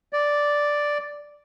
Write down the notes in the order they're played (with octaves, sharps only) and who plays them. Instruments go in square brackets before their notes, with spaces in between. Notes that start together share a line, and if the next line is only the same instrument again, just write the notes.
[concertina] D5